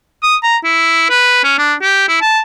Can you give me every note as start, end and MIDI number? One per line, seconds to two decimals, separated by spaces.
0.23 0.36 87
0.44 0.57 82
0.64 1.08 64
1.10 1.42 71
1.44 1.56 61
1.58 1.74 62
1.82 2.07 67
2.08 2.17 64
2.21 2.40 81